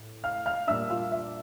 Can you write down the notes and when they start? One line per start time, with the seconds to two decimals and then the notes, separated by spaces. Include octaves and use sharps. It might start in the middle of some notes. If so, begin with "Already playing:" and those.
Already playing: A2
0.24 F5 F6
0.46 F5 F6
0.67 A#2 G3 D4 E5 E6
0.90 F4 F5
1.12 E5